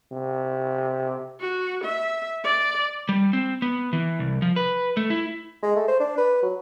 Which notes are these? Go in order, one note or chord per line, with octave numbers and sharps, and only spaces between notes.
C3
F#4
E5
D5
G3
C4
B3
E3
C2
F3
B4
A3
E4
G#3
A3
C5
D4
B4
F#3